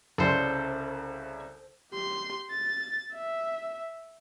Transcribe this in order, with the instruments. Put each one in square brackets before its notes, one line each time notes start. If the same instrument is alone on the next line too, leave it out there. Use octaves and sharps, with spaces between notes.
[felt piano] C2 C#3 D5 [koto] A4 C5
[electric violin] G4 C6
A6
E5